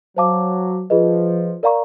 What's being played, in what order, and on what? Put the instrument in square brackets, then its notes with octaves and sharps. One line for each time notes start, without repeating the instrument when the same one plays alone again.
[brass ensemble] F#3 [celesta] C5 F5 A5 D6
[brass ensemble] F3 [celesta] F4 G#4 B4 D#5
[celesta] A#4 D5 F5 A#5 C#6